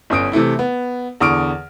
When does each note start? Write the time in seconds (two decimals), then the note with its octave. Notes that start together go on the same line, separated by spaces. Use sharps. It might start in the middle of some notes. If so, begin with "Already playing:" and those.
0.10 G1 C#4 D#6 D7
0.32 C3 E3 A3 E4
0.59 B3
1.20 E2 D3 C#6 D#6 F6 D7